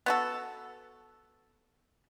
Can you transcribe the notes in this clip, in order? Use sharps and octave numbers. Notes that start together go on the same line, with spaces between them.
B3 F#4 A4